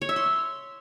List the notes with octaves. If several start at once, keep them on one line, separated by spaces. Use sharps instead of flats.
C#5
E5
C6